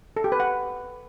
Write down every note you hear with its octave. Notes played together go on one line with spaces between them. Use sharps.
A4
G4
B4
F#5